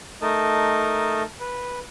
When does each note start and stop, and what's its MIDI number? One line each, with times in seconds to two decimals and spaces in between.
0.22 1.23 57
0.22 1.23 63
0.22 1.23 70
0.22 1.23 75
0.22 1.23 81
1.40 1.79 71